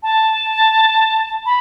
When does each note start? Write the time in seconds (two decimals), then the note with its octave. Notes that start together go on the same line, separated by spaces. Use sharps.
0.03 A5
1.46 B5